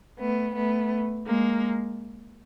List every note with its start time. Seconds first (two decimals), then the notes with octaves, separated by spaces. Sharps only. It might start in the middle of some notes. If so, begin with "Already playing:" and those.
0.19 A3 B3
0.55 A3 B3
1.27 G#3 A#3